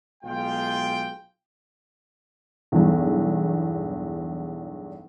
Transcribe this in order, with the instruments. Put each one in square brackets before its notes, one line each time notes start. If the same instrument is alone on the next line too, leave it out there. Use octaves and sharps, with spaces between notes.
[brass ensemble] B1 G#3 F4 G5
[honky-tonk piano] B1 E2 G2